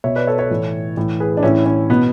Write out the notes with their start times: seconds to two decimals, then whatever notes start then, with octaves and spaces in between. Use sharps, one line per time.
0.04 B2 C#5 E5
0.16 B4 D5
0.27 A4 C#5
0.38 A4 C#5
0.50 A2 E3
0.97 A2 E3
1.20 G#4 B4
1.37 D4
1.43 A2 E3 C#4 E4
1.66 C#4
1.90 B2 B3